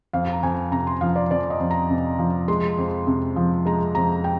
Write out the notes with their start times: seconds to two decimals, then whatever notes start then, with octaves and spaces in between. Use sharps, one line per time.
0.13 F2 F5
0.33 A#5
0.43 F2 G#5
0.72 C3 A#5
0.87 C6
1.01 F3 F5
1.16 D5
1.31 F2 D5
1.50 D#5
1.60 F2
1.71 A#5
1.90 C3
2.19 F3
2.48 G#3 C6
2.78 F2
3.07 C3
3.36 F3
3.65 G#3 A#5
3.95 F2 A#5
4.24 G5